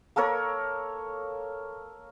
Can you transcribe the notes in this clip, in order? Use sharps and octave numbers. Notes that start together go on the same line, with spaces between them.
A#3 A4 A#4 C#5